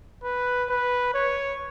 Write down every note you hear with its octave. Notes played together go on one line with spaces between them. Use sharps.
B4
B4
C#5